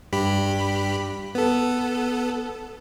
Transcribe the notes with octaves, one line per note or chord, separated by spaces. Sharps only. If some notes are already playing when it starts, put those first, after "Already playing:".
G2 G4 B5
B3 A4